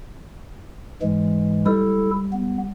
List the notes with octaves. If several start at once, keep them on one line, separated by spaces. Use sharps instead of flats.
G#2 E3 G#3
G3 E4 A4
B3